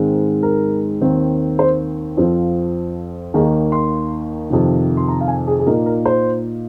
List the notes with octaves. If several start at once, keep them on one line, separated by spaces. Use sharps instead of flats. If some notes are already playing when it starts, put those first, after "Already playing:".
Already playing: G#2 D#3 G#3 C4
A#4
D#2 D#3 C4
C5
F2 F3 C4 F4
D#2 D#3 A#3 D#4 G#4
C6
F2 C3 D#3
C6
A#5
F5
G#5
G#4
G#4
A#2 A#3 D#4 A#4
A#4
C5